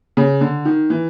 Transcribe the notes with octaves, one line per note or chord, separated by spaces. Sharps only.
C#3
D3
D#3
E3